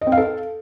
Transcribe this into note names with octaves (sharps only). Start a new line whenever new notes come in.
D#5
C4
F5
A4